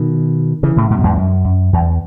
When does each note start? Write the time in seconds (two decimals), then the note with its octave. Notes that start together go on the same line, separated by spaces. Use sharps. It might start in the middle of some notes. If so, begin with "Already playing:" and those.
Already playing: B2 D#3
0.63 C#3 E3
0.77 A2 C#3
0.90 G#2 B2
0.99 F#2
1.03 E2 G#2
1.18 F#2
1.45 F#2
1.73 E2